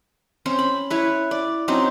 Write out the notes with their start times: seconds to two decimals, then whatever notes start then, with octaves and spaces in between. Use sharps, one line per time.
0.46 C4 C#4 C5
0.59 B5
0.90 E4 B4 C#5
1.31 D5
1.68 F#3 C4 C#4 D#4